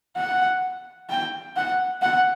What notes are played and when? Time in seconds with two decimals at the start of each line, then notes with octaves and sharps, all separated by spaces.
0.17 F#5
1.09 G5
1.56 F#5
2.02 F#5